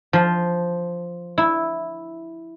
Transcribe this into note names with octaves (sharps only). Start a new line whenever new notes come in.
F3
E4